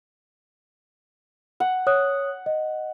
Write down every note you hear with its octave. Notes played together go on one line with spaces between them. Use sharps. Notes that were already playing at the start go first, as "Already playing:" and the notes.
F#5
C#5 D#6 F#6
D#5